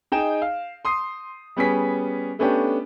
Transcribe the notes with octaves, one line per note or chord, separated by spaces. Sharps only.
D#4 G#4 D#5 G5 E7
F5
C6 D#6 C7
G3 B3 C#4 G#4 B6
A3 B3 C#4 D4 G4